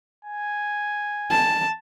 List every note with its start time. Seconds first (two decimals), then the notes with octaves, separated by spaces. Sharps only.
0.25 G#5
1.31 A5